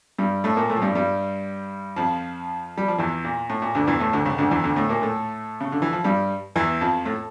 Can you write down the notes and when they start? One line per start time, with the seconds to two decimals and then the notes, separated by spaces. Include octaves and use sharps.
0.19 G2 G3
0.44 A2 A3
0.56 A#2 A#3
0.70 A2 A3
0.76 F3
0.82 G2 G3
0.95 G2 G3
1.96 F2 F3
2.78 G3
2.88 F3
2.98 E2 E3
3.24 A#2
3.50 A2
3.62 A#2
3.75 D2 D3
3.87 E2 E3
4.00 A2 A3
4.13 D2 D3
4.26 C#2 C#3
4.38 D2 D3
4.51 E2 E3
4.64 D2 D3
4.76 A2 A3
4.89 A#2 A#3
5.02 A2 A3
5.61 C#3
5.72 D3
5.82 E3
5.93 F3
6.04 G2 G3
6.56 E2 E3
6.81 F2 F3
7.05 A2 A3